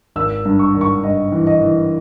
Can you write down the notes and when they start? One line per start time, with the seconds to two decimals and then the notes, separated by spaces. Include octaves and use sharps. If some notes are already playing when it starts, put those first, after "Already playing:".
0.16 G#1 E6
0.45 G2
0.59 C#6
0.75 G#1
0.81 C#6
1.04 G2 D#5
1.32 E3
1.47 D#5
1.62 E3